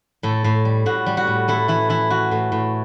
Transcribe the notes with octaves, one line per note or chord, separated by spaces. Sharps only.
A2 A4
A2
G3
A2 F#4
G3
F#4
A2
A3 E4
E3 E4
E3 E4
E3 F#4
A2
A2